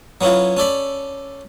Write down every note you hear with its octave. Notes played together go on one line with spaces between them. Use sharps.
F#3 B3 C#4 E4 F4
C#4 A4 D5 B5